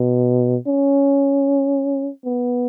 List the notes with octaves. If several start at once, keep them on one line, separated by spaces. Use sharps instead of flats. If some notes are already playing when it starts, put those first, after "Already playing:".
Already playing: B2
C#4
B3